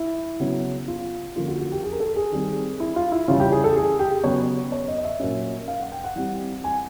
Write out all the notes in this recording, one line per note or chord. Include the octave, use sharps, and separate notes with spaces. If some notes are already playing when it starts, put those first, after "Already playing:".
Already playing: E4
C#3 F#3 B3
F4
D3 F3 A#3 C#4 F4
F#4
F#4
G4
G#4
A#4
A4
G#4
D#3 G3 C4
E4
F4
E4
C#3 E3 G3 F4
G4
G#4
A4
G#4
G4
C#3 F#3 B3 C#5
C#5
D#5
D#5
E5
A#2 F#3 A#3 C#4
F5
F#5
G5
F#5
E3 G3 C4
G#5